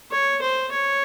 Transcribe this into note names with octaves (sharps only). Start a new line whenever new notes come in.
C#5
C5
C#5